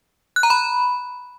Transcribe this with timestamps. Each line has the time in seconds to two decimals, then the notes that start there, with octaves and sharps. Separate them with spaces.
0.36 F#6
0.43 A#5
0.50 B5